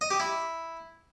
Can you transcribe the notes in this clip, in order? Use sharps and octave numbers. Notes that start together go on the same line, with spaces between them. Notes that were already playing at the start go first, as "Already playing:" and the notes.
D#5
G4
E4